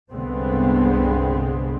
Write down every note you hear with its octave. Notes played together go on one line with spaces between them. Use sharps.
C2 G2 D3 G#3 B3 C4